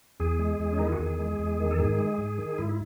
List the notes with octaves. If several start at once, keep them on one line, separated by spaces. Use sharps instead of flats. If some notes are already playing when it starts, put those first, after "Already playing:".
E2 G#4
G#3
E2
C#4
D#3 D#4
E4
F#4
E2 G#4
G#3
E2
D#3
A4
G#2 G#4
G#3
G#2
D#3
G#2 E4
E4